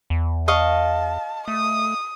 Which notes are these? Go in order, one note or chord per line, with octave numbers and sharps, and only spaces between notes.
E2
D#5 F5 A5 C#6
A3 D#6